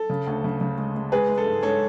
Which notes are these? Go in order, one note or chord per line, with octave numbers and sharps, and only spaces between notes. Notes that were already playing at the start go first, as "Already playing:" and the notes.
Already playing: A4
C#3
D2
C#3
C#3
G#3
G#3
G#3 G#4 B4
G#3
A4
G#2
G#2 A4 C#5